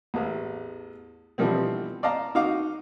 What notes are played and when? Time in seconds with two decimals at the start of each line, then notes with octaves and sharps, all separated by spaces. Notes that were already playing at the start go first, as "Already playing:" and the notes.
0.14 A1 E2
1.38 B2 D3 E3 F3 G3 C4
2.03 D5 D#5 F5 A5 A#5
2.35 D#4 F#4 F5 D6